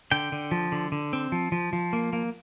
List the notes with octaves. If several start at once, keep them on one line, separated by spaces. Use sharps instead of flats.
D3 G5
D3
F3
D3
D3
C4
F3
F3
F3
A#3
A#3